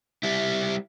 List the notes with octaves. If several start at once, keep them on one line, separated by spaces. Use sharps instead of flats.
G3 E4